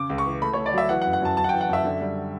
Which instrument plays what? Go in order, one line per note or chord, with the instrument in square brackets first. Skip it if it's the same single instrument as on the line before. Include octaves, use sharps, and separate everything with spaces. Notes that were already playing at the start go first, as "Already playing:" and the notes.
Already playing: [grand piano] C#3 D6
C#2
C#6
E3
A3 B5
C#5
A3
D5
F#3 E5
E3 F#5
F#5
F#2
F#5
F#2 A5
F#2 A5
F#5
G5
E3
F#5
F#2 E5
D3
G3